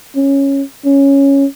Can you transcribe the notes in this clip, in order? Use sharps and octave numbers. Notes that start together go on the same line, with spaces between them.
C#4
C#4